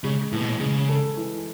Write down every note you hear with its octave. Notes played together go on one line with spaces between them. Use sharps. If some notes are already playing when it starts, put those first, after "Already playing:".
C#3 G#3
A2 E3
B2
A2
C#3 G#3
A4
E3